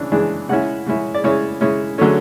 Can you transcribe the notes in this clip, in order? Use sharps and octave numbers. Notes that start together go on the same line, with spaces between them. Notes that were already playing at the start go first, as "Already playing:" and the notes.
Already playing: C#3 E3 D4
C#3 E3 G#3 D4
C#3 G#3 C#4 E4 F#5
C#3 G#3 C#4 E4
D5
C#3 G#3 C#4 E4 C#5
C#3 G#3 C#4 E4
D3 F#3 A3 C#4